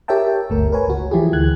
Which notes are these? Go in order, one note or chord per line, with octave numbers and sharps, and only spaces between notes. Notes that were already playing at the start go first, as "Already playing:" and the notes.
G4 A#4 C#5 E5 G5 A5
G1 D2 A3 A#4
A#4 B4 C#5 G#5
C#2 F#4
E3 F3 E4 G4 G#4
D2 F#6 G#6